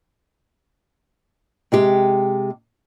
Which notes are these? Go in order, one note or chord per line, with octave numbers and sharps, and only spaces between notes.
C3 G#3 G4